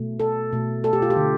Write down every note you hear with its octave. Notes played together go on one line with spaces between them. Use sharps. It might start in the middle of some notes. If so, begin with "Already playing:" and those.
Already playing: B2 A3
A4
B2 A3
A4
G4
F4
G4
D3 A3